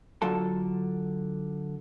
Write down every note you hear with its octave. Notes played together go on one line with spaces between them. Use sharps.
D3 F#3 F4 A4 A5